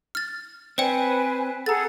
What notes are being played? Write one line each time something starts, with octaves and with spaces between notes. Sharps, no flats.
F6 A6
C4 B4 C5 D5 G5 G#5
G#4 A4 F#5 A#5 A6